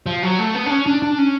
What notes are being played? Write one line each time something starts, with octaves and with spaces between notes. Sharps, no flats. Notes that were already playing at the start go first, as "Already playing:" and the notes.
F3
F#3
A3
B3
D4
C#4
D4
D4
C#4